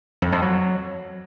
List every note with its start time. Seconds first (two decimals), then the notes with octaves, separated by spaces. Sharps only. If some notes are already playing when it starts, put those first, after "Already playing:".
0.22 F2
0.32 F2
0.42 F#3